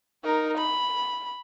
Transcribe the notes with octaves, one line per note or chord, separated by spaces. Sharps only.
D#4 A#4
B5